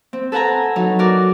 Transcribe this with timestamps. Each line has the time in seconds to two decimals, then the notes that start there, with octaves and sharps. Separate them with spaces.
0.13 C4
0.32 A4 B4 F#5 G#5 A#5
0.76 F#3 D#4
0.99 F#4 A#4 D5